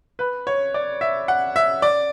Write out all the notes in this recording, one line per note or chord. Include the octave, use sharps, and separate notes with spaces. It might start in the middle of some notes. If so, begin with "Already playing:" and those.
B4
C#5
D5
E5
F#5
E5
D5